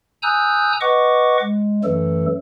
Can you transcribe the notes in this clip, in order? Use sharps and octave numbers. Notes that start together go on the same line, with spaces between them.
G#5 A#5 D#6 E6 F#6 G6
B4 D#5 F#5 C#6 D6
G#3
F#2 E3 F#3 A3 A4